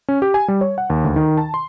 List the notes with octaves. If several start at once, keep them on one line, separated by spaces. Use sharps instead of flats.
C#4
G4
G#5
G3
C#5
F#5
D#2
D2
D#3
A5
C6